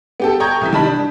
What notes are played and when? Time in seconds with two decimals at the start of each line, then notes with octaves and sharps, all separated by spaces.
0.20 B3 G4 A4
0.40 G5 A#5 C#6 D#6 G6 G#6
0.61 C2 E3 B6
0.73 D#3 G3 A5 B5 B6
0.86 D4